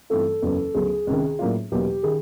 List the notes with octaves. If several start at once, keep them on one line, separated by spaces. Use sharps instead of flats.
G2 E3 A3 C4 F4 A4
F#1 E2 C#3 F#3
D2 C#3 F#3 B3 G#4
C#2 C3 D#3
A2 F#3 A#3 D4 F4
E2 B2 F#3 A#3 G4
D#3 G#4